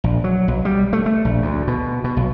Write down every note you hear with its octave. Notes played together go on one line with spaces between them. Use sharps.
A#1
F#3
B1
G3
A3
A3
A#1
D2
B2
B2
B1